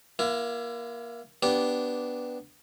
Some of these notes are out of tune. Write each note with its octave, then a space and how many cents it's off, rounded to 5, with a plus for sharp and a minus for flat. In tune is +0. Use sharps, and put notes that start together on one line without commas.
A#3 +20 E4 +40
B3 +0 D4 +0 G4 -10